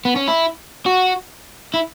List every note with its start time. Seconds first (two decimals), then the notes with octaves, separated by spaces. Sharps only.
0.05 B3
0.16 C#4
0.27 E4
0.86 F#4
1.74 E4